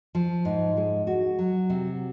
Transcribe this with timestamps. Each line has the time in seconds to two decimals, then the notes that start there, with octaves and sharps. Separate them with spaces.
0.15 F3
0.45 G#2
0.77 G#3
1.07 F#4
1.39 F#3
1.70 C3